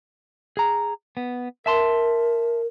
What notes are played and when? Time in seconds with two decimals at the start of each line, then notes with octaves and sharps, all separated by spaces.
0.57 G#4 A#5
1.17 B3
1.66 A#4 E5 A5 C6